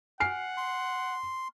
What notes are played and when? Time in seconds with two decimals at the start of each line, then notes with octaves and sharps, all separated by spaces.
0.20 F#5 G#5 F6 C7
0.57 C6